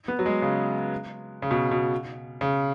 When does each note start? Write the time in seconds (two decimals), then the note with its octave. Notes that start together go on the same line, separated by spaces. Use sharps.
0.08 B3
0.19 F#3
0.26 G#3
0.42 C#3
1.42 C#3
1.51 B2
1.71 B2
2.41 C#3